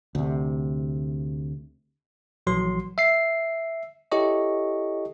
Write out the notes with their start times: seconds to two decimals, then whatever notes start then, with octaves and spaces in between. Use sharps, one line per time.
0.15 D2 C3
2.47 A#1 E3 F#3 C6
2.98 E5 C7
4.12 E4 G4 A4 C#5 D#5 C#6